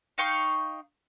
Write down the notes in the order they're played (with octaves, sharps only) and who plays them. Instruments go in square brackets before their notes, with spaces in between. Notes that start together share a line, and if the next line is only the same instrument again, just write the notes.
[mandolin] D#4 F5 G5 C#6